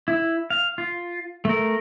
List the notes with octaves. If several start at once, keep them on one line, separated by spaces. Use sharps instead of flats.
E4
F5
F4
A3 A#4